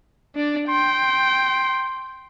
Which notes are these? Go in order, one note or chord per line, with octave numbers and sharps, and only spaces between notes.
D4 D5
G5 C6